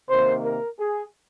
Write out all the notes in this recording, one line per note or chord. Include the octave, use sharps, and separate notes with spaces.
C3 D#3 A#3 C5
A#4
G#4